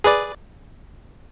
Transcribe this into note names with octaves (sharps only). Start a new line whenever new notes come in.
G#4 B4 D5